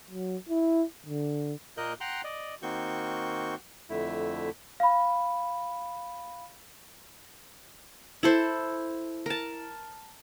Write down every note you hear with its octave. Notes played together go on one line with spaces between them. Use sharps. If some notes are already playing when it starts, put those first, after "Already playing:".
F#3
E4
D3
A#2 A#3 A#4 D#5 F#6 G6
F#5 G5 A#5 C6 F#6
D5 D#5
D#3 A#3 C4 F#4 C#6 G6
F2 D3 A3 E4
F5 B5
E4 A4 C5
A#4 A5